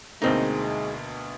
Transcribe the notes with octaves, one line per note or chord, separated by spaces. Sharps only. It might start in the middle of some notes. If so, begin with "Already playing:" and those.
D2 B2 G#3 A#3 C4 D#4